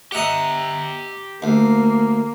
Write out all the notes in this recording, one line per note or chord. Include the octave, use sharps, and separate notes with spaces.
G4 D#5 E5 F#5 A#5
D2 A#3